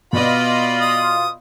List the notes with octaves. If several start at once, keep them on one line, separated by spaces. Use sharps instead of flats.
B2 B3 F4 D5 D#5 B5
D#6